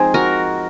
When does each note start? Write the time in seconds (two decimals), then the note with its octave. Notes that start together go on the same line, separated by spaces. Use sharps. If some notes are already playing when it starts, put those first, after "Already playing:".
Already playing: F3 G#3 C4 D#4 G#4
0.14 F#4 A#4